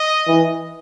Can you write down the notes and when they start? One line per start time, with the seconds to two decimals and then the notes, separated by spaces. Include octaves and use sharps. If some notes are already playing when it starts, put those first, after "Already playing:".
Already playing: D#5
0.27 E3